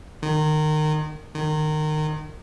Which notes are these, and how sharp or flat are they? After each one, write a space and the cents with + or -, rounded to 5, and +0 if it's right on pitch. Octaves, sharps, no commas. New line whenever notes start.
D#3 -25
D#3 -25